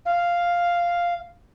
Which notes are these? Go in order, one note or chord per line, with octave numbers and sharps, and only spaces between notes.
F5